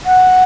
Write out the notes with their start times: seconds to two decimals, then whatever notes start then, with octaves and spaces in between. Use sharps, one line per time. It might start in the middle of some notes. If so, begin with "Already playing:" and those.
0.06 F#5